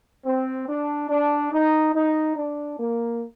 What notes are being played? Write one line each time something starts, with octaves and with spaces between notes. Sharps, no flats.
C4
D4
D4
D#4
D#4
D4
A#3